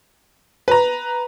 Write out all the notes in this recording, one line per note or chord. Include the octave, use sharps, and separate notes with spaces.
B4 A#5